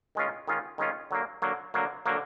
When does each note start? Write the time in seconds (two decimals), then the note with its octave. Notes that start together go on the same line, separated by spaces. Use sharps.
0.15 D#3 G#3 C#4 F4
0.48 D#3 G#3 C#4 F4
0.78 D#3 G#3 C#4 F4
1.11 D3 F#3 A#3
1.42 D3 F#3 A#3
1.74 D3 F#3 A#3
2.06 D3 F#3 A#3